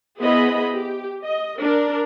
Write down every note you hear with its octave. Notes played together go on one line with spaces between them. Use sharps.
B3 E4 G#4 C5 D#5 B5
G4
D#5
D4 A#4